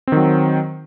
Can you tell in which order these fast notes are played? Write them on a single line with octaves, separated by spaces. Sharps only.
C4 D#3 F#3